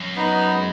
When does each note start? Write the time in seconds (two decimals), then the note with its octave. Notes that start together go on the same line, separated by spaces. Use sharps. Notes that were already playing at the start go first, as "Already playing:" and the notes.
Already playing: F#2
0.16 B3 D#4
0.53 G#3